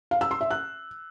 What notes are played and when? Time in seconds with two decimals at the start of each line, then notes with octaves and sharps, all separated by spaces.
0.11 F5
0.21 E6
0.31 C6
0.41 E5
0.51 F#6